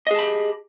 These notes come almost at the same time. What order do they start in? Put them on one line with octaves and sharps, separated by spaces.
D#5 G#4 A5 B5 G4